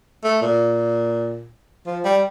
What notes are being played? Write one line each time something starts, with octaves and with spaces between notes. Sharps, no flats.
A3
A#2
F3
G3